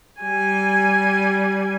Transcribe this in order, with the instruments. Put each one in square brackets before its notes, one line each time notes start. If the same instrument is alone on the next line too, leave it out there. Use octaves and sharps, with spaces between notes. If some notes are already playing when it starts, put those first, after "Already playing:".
[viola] G3 G#5